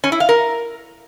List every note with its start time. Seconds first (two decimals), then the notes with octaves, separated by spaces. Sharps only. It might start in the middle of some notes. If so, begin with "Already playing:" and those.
0.04 C#4
0.12 E4
0.20 F5
0.29 A#4